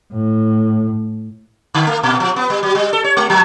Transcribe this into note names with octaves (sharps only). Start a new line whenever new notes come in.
A2
D3
A3
A#2
F3
B3
G3
F#3
G3
A4
C#5
G#3
F3